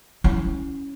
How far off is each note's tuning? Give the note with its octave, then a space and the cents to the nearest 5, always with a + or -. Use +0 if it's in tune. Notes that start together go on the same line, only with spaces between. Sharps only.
C#4 +0 E4 -5